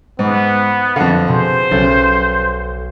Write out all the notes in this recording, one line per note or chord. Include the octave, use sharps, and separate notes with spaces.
G#2 B3
F2 D3 A4 F5
B2 G#4 C5
B1 C#3 A4